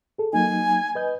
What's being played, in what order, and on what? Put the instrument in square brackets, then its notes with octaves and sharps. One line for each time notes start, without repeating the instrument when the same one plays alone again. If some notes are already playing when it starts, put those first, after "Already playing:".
[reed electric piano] G#4 A4
[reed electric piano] F#3 A#3 D#4 [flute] G#5
[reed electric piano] B4 D#5 G6